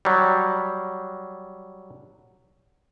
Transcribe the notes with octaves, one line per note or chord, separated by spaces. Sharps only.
F#3 G3